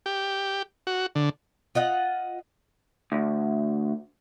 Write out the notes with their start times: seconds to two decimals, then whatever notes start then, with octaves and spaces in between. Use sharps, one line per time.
0.06 G4
0.87 F#4
1.15 D3
1.75 F4 D#5 F#5
3.12 D2